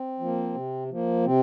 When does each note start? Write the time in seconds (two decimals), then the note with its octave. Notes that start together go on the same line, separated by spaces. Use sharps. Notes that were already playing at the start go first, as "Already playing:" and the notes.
Already playing: C4
0.20 F3 A#3
0.55 C3
0.90 F3 A#3
1.25 C3 C4